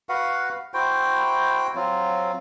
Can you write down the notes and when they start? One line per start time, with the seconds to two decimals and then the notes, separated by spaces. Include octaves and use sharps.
0.09 F#4 B4 F5 F#5
0.74 E4 F#4 C5 G5
1.75 F#3 C4 F4